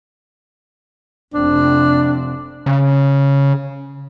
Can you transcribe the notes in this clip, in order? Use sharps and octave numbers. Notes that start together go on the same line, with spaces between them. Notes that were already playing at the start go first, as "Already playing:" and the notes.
F1 F2 C4 D4
C#3